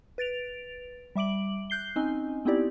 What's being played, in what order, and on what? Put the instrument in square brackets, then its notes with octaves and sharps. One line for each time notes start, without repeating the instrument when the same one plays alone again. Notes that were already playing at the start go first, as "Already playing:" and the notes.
[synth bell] B4 A6 D7 F7
G3 E5 D6 D7 F#7
F#6 G6 C7 G7
C4 C#4 D#4 D#5 G#5
B3 C4 D#4 E4 G4 D5